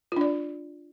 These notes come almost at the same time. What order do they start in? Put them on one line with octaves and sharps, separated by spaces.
F4 D4 D5